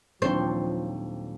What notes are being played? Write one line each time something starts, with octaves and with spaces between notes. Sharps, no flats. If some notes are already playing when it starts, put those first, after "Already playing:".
D#1 F3 F#3 C4 D4 C5 C#6 G6